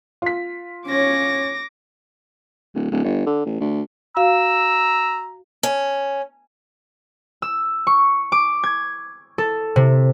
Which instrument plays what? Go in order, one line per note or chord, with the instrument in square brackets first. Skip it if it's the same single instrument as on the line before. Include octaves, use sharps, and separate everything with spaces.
[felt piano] F4 B6
[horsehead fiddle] C#4 C#5 [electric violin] D6 A#6
[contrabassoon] D1
D1
G1
D3
A1
D2
[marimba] F#4 F5 [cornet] A#5 [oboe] E6
[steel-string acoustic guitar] C#4
[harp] E6
C#6
D6
G#6
A4
C3